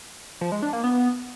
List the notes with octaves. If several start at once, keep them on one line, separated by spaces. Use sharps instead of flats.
F3
G#3
D4
A#3
B3